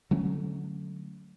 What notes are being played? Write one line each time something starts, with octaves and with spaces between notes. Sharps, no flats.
D3 F#3 A3 C#4